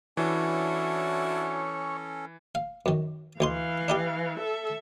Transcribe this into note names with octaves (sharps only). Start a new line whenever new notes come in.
E3 C#4 D4 E4 F#4 A4 C#5
F5
F#2 D#3
D2 E3 D#4 F5 C6
D4 D#4 G4
A4 E5